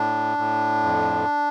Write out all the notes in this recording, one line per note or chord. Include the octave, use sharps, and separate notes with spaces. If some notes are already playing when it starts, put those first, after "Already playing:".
Already playing: A2 D4
A2
F2